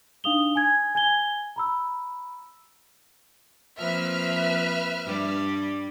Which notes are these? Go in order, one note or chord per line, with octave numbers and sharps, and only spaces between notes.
D4 D#4 F5 D#6 F7 G7
G#5 G#6
G#5 G#6 G7
A#5 B5 E6
F3 A#3 C4 B4 E5 F6
G2 G3 G4